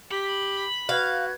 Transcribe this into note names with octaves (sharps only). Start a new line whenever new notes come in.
G4 B5
F#4 B4 F5 F#6 G#6